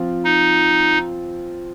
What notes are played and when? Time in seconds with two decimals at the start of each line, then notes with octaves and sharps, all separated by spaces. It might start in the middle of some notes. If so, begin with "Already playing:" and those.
Already playing: F3 C4 F4
0.24 D#4